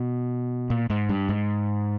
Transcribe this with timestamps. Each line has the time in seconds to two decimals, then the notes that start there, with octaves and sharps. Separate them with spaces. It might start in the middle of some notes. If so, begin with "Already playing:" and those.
Already playing: B2
0.70 A#2
0.90 G#2
1.09 G2
1.29 G#2